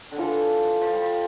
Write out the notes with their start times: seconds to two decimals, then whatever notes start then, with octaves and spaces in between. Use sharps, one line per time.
0.12 D3
0.18 E3 D4 F4 A4
0.81 F3
0.92 G3
1.01 F3